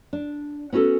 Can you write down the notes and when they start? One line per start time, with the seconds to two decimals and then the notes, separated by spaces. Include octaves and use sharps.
0.13 D4
0.73 B3 C#4 F#4 G#4 A4